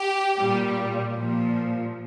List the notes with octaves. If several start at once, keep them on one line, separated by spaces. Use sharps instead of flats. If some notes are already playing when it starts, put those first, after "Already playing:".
Already playing: G4
A#2 G3
A#2 F3